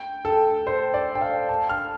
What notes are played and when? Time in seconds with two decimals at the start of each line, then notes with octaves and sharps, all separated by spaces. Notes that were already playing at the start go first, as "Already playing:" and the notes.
Already playing: G5
0.25 A4
0.67 C5
0.94 D5
1.15 G5
1.21 F5
1.49 A5
1.69 F6